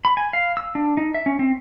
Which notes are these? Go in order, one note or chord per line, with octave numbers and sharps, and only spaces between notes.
B5
G#5
F5
E6
D4
D#4
E5
C#4
C4